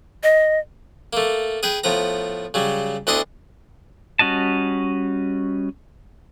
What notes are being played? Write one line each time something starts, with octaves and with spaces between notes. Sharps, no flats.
D#5
A3 A#3
G#4 B4 G5
A2 F3 B3 A#5
C#3 F#3 G3
D2 B3 D4 E4 D#5 C6
G3 C#4 F#4 D#5 A5